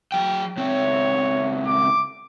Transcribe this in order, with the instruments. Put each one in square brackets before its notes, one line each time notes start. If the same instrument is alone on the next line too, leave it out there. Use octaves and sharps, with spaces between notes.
[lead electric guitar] F#3 G5
[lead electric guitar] C#2 C4 [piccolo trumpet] C#5
[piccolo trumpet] D6